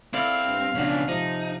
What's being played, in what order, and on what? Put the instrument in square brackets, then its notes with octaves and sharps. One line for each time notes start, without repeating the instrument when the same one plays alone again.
[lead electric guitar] C4 [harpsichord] E4 A4 D5 [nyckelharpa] F5
[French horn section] G2
[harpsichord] B1 F#4 [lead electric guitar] C#3 F3 [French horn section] B3 C#4 D4
[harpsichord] C3 A#5 [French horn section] F3 [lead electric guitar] D#4